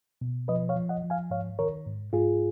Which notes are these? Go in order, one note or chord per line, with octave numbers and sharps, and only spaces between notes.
B2
F3 B4 D#5
C#5 F5
F3
D#5 F#5
F3
F5 G#5
G#2 C#5 F5
D#3 A#4 C#5
G#2
G#2 F4 G#4